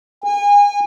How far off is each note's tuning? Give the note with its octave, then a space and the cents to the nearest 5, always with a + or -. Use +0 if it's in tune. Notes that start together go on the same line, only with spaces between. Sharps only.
G#5 -30